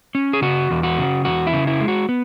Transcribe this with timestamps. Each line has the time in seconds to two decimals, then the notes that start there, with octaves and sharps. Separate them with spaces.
0.15 C#4
0.33 G#4
0.42 C#3 F#4
0.71 E2
0.83 F#4
0.98 C#3
1.25 E2 F#4
1.47 E4
1.53 C#3
1.67 E4
1.81 G#3
1.88 F#4
2.09 B3